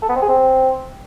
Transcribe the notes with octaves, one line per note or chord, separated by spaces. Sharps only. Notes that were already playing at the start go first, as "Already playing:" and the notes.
A4
B3
C4
G#4
C4